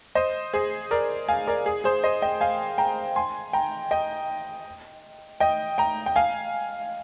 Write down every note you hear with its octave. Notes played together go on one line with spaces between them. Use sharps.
C5 D#5
G#4 C5
A#4 D5
F5 G#5
A#4 D5
G#4
G#4 C5
C5 D#5
D#5 G5
F5 G#5
G5 A#5
G#5 C6
G5 A#5
D#5 G5
D#5 G5
G5 A#5
G5
F5 G#5